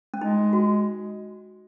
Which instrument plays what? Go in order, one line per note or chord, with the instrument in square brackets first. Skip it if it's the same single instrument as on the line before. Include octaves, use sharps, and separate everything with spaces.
[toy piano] C#4
[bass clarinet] G#3 [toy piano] D#4
[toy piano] F#4